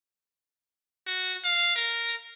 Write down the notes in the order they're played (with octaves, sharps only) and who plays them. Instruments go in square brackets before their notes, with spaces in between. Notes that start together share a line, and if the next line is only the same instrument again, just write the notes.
[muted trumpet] F#4
F5
A#4